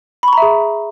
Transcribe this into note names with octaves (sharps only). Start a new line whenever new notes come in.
G#4 E5 A#5 B5 C#6